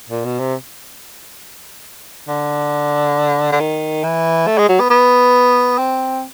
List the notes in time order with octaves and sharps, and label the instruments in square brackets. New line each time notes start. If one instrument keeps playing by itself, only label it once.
[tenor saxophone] A#2
B2
C3
D3
D3
D#3
E3
A3
G#3
F#3
B3
B3
C4